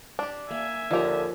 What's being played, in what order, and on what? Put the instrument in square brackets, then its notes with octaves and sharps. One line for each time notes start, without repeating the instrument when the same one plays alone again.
[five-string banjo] D4 G4
[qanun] A#3 [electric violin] E5 G#5
[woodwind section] D#2 D3 [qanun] F3 A#5 [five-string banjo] D#4 G4